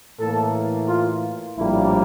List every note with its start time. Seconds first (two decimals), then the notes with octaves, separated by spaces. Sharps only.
0.19 A2 E3 A#3 A4
0.88 F4
1.57 A#1 A2 G3 A#3 E4